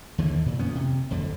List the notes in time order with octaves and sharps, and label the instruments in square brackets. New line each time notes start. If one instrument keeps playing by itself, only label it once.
[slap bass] D#2 D3 E3
A#2
F2 A#2 B3 C#4
C3
F#1 F2 D3